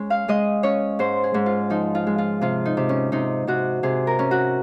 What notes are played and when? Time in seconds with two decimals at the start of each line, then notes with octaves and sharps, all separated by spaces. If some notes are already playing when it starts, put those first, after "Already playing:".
Already playing: G#3 C#4 C#5
0.10 F5
0.28 G#3 D#5
0.63 C#4 C#5
0.99 G#2 C5
1.24 G#4
1.34 G#2
1.46 F4
1.70 F3 D#4
1.95 F4
2.07 G#3
2.18 F4
2.41 C3 F4
2.65 D#4
2.77 C3
2.89 C#4
3.12 C3 D#4
3.47 C3 F#4
3.83 C3 G#4
4.07 A#4
4.19 C#4
4.31 F#4